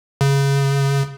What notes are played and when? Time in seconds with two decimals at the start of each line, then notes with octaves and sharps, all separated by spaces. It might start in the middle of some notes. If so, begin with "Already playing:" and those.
0.21 C#3